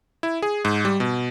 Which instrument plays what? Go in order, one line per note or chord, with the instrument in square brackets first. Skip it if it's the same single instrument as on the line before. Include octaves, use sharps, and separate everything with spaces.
[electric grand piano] E4
G#4
G#2
G3
B2